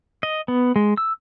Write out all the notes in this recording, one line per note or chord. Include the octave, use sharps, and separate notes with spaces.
D#5
B3
G#3
E6